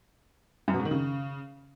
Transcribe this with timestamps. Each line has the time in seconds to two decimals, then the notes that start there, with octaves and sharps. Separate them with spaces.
0.68 F#2
0.74 B2
0.79 G#2
0.85 D#3
0.91 C#3